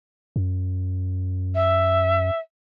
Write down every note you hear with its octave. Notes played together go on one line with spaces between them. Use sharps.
F#2
E5